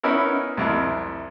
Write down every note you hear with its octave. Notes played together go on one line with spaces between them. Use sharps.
B3 C#4 D#4 E4 A#4
C2 F2 E4